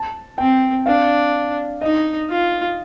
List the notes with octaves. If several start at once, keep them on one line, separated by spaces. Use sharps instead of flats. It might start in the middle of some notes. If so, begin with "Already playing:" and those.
Already playing: A5
C4 G5
D4 F5
D#4 D#5
F4